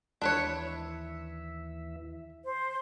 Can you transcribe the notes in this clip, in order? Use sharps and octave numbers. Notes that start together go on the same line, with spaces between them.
D#2 E3 D4 B4 C#5 E5
C5